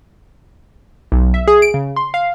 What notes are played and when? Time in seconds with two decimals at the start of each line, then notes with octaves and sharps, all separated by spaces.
1.12 B1
1.34 E5
1.47 G#4
1.62 D7
1.74 C#3
1.96 C6
2.14 F5